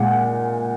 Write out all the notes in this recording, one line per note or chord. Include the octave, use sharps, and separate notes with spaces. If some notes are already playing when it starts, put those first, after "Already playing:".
Already playing: A#2 G#3 F#5